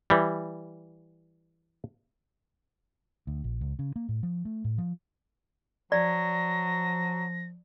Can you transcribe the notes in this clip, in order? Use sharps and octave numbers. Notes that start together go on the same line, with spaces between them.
E3 G3
D2
A#1
C#2
C#3
A#3
A2
F3
A3
A2
F3
F3 F#3 D5 A#6